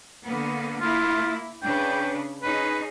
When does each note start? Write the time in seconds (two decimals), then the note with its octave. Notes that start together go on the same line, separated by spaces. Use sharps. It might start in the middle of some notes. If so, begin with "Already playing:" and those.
0.24 D3 A#3 B3
0.81 A#3 E4 F4
1.63 C#3 D4 B4 G5
2.43 C#4 D#4 G#4 B4